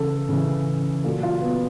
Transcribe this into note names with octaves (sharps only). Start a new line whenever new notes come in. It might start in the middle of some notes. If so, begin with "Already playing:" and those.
Already playing: C#3 E3 A4
C#3 E3
A#2 F#3 A4
F4
B3